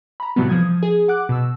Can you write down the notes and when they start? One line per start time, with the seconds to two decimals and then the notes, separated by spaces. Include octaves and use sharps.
0.20 A#5 B5
0.36 A2 C3 E3 F#3 G3 B3
0.49 F3 D#6 G#6
0.83 G#4
1.08 F#5 D6 F#6
1.29 B2 E6